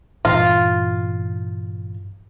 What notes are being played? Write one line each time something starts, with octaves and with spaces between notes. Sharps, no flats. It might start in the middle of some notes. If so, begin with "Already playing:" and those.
G2 A#2 E3 F4